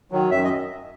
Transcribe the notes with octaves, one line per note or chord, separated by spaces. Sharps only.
D#3 F#3
F#2 E5
D#5